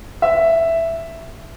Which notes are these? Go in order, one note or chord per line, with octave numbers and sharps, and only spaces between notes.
E5